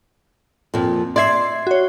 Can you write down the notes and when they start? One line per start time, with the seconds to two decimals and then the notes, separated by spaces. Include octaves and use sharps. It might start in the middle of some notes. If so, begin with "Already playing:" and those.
0.74 F2 A#2
1.16 D5 E5 C6 G#6 C7
1.67 F#4 C#5